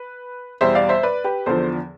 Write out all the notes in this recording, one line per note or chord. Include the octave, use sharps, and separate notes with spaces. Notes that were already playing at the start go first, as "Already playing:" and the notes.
Already playing: B4
E2 B2 G3 C5 E5
D5 F5
C5 E5
B4 D5
G4 B4
E2 D3 F3 A4 C5